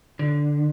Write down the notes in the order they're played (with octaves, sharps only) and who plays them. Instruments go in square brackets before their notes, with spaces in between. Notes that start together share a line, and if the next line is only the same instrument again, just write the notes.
[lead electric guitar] D3